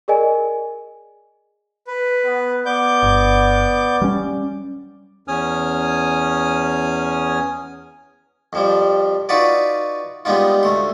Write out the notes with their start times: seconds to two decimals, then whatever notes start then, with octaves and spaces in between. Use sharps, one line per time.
0.08 G#4 A#4 D5 D#5 G#5
1.87 B4
2.25 B3
2.66 B3 D5 D6 G6
3.03 G1
4.02 G3 C#4
5.28 E2 C#4 G#5 D#6 F6
8.53 F2 F3 G3
9.29 D#4 F4 F#4 B4 D5
10.25 G3 G#3 B3 D#4 F4
10.63 D2 A3 C6